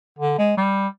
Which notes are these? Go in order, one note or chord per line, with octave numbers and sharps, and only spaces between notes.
D3
G#3
G3